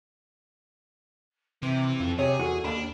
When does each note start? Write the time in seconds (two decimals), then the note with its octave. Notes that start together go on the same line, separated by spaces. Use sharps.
1.63 C3 E3 C4
2.00 F2
2.19 C3 G4 G#4 C#5
2.39 E2 F#4 A4
2.64 D#2 D4 F5 B5